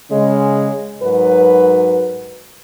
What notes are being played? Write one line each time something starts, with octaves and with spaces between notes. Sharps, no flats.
C#3 G#3 C#4
G#2 F#3 F#4 A#4 B4